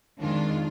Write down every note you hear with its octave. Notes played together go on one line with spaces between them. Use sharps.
F2 D#3 G#3 D4 F4